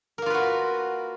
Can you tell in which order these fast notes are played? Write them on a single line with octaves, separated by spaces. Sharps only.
A#4 A#3 F4 B4 F#4